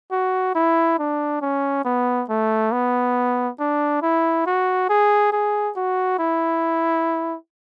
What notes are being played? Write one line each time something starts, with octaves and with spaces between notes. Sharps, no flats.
F#4
E4
D4
C#4
B3
A3
B3
D4
E4
F#4
G#4
G#4
F#4
E4